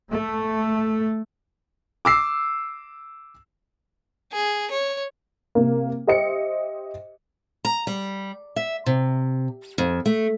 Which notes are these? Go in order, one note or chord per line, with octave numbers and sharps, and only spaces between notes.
A3
D6 E6 C7
G#4
C#5
C3 A#3
G4 C5 D#5 E5 C#7
A#5
G3
E5
C3
F2
A3